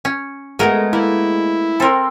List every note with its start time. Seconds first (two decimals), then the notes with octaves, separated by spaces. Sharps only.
0.05 C#4
0.59 G#3 A3 B3 F#4 A#4
0.93 A#3 E4
1.80 C4 A4 A#4 C6